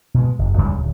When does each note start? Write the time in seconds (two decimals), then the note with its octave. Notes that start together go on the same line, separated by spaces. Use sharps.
0.14 B2 G#3
0.39 F#1
0.58 D2 C#3 G3 G#3
0.77 D1